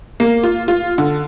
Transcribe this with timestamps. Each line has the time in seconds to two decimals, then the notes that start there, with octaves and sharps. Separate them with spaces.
0.20 A#3
0.43 F4
0.68 F4
0.98 D3